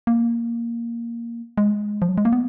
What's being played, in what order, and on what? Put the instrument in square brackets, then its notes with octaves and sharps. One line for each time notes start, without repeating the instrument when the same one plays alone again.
[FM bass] A#3
G#3
F3
F#3
G#3
A#3
B3